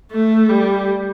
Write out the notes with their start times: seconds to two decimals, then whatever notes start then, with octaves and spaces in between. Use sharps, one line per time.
0.12 A3
0.49 G3